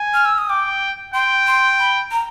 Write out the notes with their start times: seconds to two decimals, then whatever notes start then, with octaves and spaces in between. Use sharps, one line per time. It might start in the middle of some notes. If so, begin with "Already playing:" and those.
Already playing: G#5
0.14 F6
0.25 E6
0.38 D#6
0.49 G5 D6
1.14 G5 C6
1.47 C6
1.80 B5
2.11 A#5